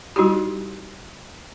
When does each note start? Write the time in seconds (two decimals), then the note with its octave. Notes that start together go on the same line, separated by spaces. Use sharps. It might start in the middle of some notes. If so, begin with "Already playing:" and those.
0.16 G3 D#4 E4 F#4 G4